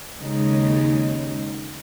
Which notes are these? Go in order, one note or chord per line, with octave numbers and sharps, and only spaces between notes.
D#2 C#3 G#3 D#4